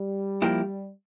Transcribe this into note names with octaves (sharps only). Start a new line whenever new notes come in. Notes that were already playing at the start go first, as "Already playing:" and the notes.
Already playing: G3
F3 A#3 E4 G4